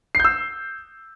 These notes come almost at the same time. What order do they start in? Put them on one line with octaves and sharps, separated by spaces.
C7 G6 E6